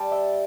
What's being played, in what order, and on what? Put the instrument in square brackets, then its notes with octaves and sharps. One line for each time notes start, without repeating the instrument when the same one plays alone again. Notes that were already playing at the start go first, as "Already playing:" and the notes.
Already playing: [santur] G3 A5
E5 G5